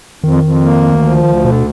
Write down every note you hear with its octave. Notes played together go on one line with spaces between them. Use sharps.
F2 D#3
F2
A#3
D2
F3
D2
B2 D3